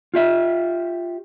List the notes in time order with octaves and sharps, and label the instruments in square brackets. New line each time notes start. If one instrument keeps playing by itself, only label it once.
[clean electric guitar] F4 G4 E5